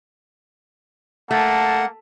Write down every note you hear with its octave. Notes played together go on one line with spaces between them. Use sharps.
A3 A#3 F#5 A5